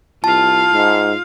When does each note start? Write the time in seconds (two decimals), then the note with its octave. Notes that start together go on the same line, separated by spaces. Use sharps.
0.24 C2 F4 F5 A5
0.72 G#2